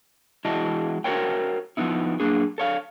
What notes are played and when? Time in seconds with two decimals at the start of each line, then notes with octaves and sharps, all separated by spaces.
0.45 E3 G#3 E4 F#4 D#5 A5
1.04 F#4 A#4 C5 C#5 G5
1.77 F3 F#3 B3 D#4 E4
2.20 F#2 A#3 D4 G#4
2.58 A4 C#5 F5